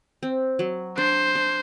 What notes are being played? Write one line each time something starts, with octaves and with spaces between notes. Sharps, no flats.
C4
F#3
D4 C5
D4